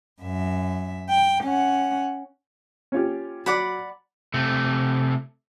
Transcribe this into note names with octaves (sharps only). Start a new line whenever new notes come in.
F#2 E5
G5
C#4 F#5
C#4 F4 G4
F#3 D5 F#5 B5
C3 A3